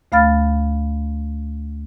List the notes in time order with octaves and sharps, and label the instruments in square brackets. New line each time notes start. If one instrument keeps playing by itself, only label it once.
[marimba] D2 A3 F5 B5 F6 A6